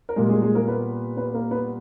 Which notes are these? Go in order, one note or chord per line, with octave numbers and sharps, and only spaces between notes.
A#4
A#2 G3 G#3 A#3 G#4
G#3 G#4
G#3 G#4
A#3 A#4
B3 B4
B3 B4
A#3 A#4
B3 B4